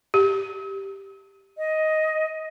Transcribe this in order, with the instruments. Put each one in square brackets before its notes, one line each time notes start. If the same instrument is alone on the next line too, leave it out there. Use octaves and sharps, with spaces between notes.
[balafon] G4
[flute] D#5